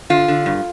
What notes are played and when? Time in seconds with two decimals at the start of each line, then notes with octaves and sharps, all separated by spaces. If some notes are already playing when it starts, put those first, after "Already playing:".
0.10 D3 F4
0.28 D3
0.46 G2